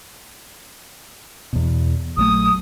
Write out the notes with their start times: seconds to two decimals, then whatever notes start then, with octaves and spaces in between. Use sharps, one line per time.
1.53 E2 B2
2.17 A#1 F#3 A3 D#6